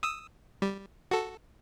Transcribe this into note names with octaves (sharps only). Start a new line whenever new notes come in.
D#6 E6
G3
F#4 A4